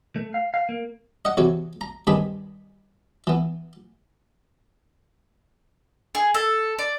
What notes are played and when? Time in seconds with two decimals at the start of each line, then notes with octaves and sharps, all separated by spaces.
0.16 A3
0.34 F5
0.54 F5
0.69 A#3
1.25 D#5 F#5
1.37 E2 C3 F#4 C#5
1.81 A#5
2.07 G2 D#3 C4 G#4 B5
3.27 E3 B3
6.15 G#4
6.34 A4
6.79 D5